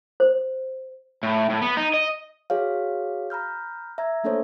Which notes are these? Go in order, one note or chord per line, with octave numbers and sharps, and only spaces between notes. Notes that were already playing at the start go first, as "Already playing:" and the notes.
C5
A2
A2
B3
D#4
D#5
F#4 G#4 C#5 F5
A#5 B5 F6 G6
E5 A#5 G#6
A3 A#3 D4 A4 C5 C#5